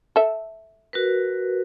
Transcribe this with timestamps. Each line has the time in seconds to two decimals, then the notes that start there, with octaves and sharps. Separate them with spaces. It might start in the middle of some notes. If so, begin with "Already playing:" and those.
0.16 A4 E5
0.93 F#4 A#4 B4